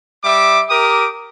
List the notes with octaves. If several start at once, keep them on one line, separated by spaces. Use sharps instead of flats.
G3 E5 D6
G4 A#4 D6 D#6